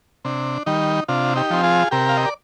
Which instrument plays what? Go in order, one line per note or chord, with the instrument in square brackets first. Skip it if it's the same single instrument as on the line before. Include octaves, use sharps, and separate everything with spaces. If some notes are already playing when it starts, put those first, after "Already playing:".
[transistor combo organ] C3 D4
D#3 G3 D#4
C3 D4 F4
D#4 G4
F3 C4
F4 G#4
C3 G4 A#4
F5
D#5
D5